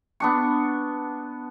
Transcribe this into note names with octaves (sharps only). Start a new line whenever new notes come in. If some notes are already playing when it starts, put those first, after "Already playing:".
B3 D4 C#6